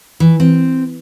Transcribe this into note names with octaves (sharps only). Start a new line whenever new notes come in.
E3
C4